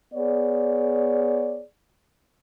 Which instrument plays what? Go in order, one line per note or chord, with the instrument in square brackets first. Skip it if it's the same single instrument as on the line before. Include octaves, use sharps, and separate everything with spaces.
[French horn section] B3 G#4 C#5 D5